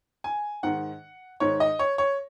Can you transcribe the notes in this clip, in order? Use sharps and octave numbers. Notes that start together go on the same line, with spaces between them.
G#5
G#2 D#3 F#5
G#2 D#3 C#5
D#5
C#5
C#5